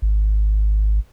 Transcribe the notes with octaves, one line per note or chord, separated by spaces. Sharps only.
G#1